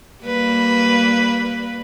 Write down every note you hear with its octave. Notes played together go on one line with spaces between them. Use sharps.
G3 A#3 B4